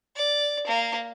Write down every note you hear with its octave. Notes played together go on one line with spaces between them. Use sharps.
D5
A#3